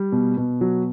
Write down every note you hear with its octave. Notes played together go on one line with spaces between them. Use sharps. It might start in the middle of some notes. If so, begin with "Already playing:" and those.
Already playing: G3
B2
B2
F#3